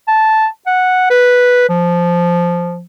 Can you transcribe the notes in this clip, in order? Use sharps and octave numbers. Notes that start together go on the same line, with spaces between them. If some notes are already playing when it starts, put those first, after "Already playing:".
A5
F#5
B4
F3